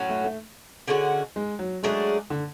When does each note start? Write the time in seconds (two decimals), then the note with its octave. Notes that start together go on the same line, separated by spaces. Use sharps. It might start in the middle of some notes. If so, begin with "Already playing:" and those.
Already playing: A2 F#3 C#4
0.09 A3
0.24 A3
0.88 D3 G#3 C#4 F#4
1.36 G#3
1.59 F#3
1.83 F#3 G#3 A3 D4 G#4
2.30 D3